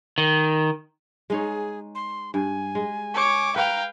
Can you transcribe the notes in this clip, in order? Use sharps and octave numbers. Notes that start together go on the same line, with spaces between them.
D#3
G#3 D#4 G#4 C#5
C6
G2 G#5
G#3
C#5 D6
B4 F5 G5 A#5